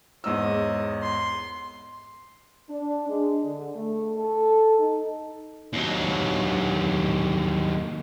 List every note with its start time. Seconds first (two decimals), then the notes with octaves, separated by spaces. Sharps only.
0.24 E2 G#2 C#5 D#5 E6
1.02 C6
2.70 D4
3.08 G#3
3.44 D3
3.76 A3
4.17 A4
4.79 D#4
5.73 D#2 F#3